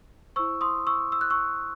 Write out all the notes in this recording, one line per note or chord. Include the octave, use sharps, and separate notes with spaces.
E4 C5 C#6 E6
C6 D#6
C#6 E6
E6
F#6
C#6 E6